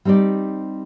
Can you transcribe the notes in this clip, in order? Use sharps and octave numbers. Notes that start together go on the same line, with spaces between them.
G3 C4 D#4 G4 D5